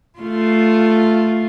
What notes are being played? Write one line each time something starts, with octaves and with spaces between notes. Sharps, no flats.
A3 F4